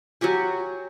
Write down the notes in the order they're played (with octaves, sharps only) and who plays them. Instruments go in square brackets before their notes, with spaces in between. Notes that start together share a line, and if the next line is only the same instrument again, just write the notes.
[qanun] F#3 F#4 G4 G#5